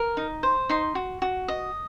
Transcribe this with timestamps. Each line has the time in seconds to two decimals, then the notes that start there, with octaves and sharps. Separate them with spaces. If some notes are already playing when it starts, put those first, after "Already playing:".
Already playing: A#4
0.17 D#4
0.43 C5
0.69 D#4 C6
0.95 F#4
1.22 F#4
1.48 D#5